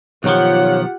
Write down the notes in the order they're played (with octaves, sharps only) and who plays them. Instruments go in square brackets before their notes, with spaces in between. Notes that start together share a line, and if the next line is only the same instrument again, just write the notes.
[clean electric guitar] B1 D#3 F3 [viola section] F4 G4 F#5 [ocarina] C#5